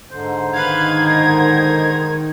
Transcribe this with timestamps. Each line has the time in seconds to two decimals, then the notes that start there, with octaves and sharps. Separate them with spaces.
0.11 G#2 D3 C5
0.54 D#3 D#4 B4 F5 G#6
1.07 A#4